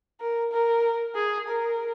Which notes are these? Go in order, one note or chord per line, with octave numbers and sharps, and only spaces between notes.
A#4
A#4
G#4
A#4